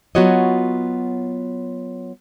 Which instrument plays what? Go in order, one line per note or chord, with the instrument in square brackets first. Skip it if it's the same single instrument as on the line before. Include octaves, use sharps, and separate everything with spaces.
[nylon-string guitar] F#3 B3 F4 F#4 C#5 D#5